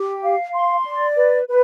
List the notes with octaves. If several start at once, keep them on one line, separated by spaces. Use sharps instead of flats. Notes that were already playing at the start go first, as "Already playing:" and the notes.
Already playing: G4
F5
C6
D5
B4
B4